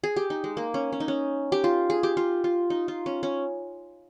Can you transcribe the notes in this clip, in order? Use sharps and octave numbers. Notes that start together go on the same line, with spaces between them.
G#4
G4
D#4
G#3
A#3
C#4
C#4
D#4
C#4
G4
F4
G#4
G4
F4
F4
D#4
F4
C#4
C#4